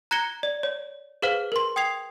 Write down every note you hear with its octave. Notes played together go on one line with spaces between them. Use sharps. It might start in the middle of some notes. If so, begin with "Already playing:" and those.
A#5 F#6 G#6 A#6 C#7 G7
D5
C#5
G#4 B4 C5 F5 F6
A#4 C6
G5 D#6 G#6 C7 F7